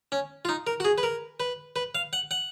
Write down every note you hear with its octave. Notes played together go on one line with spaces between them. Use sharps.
C#4
F4
D#4
A#4
F#4
G#4
B4
A#4
B4
B4
F5
F#5
F#5